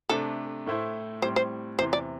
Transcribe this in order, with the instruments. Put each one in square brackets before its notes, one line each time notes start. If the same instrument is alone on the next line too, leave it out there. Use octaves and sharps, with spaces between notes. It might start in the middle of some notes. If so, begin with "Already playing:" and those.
[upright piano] C3 A3 D4 [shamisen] A4
[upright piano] A2 A3 E4 C5
[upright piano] A2 G3 C4 [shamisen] C5
[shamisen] C5
[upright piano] E2 C3 E3 [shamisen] C5
[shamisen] D5